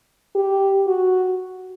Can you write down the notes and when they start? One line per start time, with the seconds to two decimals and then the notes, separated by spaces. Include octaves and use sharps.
0.35 G4
0.87 F#4